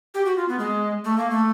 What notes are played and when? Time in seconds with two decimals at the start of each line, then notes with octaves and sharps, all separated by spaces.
0.14 G4
0.25 F#4
0.37 F4
0.48 B3
0.59 G#3
1.05 A3
1.18 A#3
1.31 A3